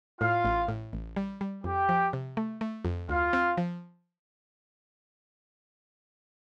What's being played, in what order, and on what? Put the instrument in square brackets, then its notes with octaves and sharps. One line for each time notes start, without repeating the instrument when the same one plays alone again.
[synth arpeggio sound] A2 [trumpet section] F4 F5
[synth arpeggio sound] A1
A2
A1
G3
G3
[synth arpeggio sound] F2 [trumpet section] G4 G5
[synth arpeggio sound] F3
C3
A3
A3
F2
[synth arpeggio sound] D2 [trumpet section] F4 F5
[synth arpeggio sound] C4
F3